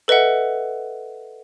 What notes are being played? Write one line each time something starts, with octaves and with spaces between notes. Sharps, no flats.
A4 B4 D#5 E5 F#5